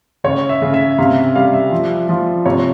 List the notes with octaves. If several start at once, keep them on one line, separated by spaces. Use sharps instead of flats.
C#3 C#5
E5
C#3
E5
C3 F5
E5
G3 F5
E5
F3
F3
C3 C#5